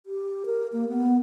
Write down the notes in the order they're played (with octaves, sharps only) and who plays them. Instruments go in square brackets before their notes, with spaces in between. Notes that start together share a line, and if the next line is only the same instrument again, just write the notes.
[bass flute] G4
A#4
A#3
B3